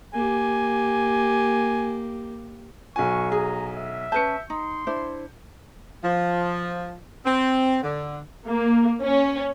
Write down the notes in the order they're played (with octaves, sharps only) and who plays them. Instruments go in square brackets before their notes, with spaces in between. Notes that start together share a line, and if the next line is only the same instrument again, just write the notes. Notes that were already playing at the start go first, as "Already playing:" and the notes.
[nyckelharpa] A#3 G4 [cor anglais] G#5
[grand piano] B1 F#4 G#5 [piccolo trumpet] C#6
[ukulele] G#4 [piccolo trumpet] A#5
[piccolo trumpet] E5
[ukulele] C#4 B4 A5 [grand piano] G6 C#7
[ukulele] D#4 [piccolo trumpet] C6
[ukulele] D4 E4 C5
[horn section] F3
C4
D3
[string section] A#3
C#4